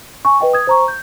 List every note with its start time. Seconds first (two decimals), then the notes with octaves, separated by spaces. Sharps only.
0.25 G#5 C#6
0.41 B4 D#5 G5
0.53 D#6 G#6
0.67 C5 A#5 C#6
0.88 G6